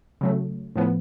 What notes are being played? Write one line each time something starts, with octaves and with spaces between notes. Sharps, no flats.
C#3 F#3 A3
A2 F3 B3